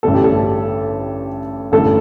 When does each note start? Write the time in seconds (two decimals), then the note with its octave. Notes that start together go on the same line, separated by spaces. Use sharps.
0.03 A1 G2 D3 A3 A4
0.14 G4
0.24 A4
1.72 A1 G2 D3 A3 A4